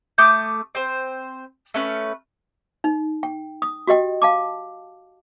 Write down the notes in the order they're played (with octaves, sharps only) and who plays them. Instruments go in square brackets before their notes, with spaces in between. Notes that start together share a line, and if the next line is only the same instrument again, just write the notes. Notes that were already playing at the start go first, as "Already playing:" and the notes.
[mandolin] A3 D6 D#6 G6
C4 C5
A3 C#4 B4 F6
[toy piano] D#4
G5
D#6
F#4 G4 D#5 G5
F5 A5 D6